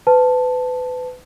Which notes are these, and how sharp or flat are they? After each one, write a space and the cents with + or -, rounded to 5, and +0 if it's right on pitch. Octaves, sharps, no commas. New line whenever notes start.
B4 +30 A5 +0